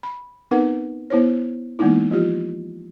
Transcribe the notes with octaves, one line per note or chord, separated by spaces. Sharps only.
B5
B3 C4 D#4 A#4 B4 F#5
B3 E4 C5 C#5
E3 G#3 A#3 B3 D#4 E4
F3 F4 G4